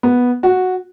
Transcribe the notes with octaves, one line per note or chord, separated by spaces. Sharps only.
B3
F#4